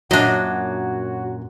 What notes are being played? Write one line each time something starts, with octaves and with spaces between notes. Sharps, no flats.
F#2 A#2 F#3 D4 F#4 D#5